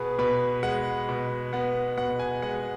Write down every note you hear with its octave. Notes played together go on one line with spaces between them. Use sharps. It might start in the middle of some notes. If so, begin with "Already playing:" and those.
Already playing: B2 B3 G#4 B4
B2 B4
G#3 F#5
B2
B3 F#5
B2 F#5
G#5
G#3 F#5